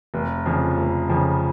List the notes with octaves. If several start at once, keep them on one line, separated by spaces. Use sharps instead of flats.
F1
F2 C#3 F3
F1
F2 C#3 F3